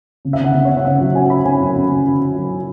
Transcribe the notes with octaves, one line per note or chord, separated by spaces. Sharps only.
C#3
E5
C#3
F#5
C#3
C#5
C#3
F#5
C#3 E5
F#3 F#5
C#4 G#5
C#4 B5
C#4 G#5
F#2
F#2
C#3
C#3
C#3
F#3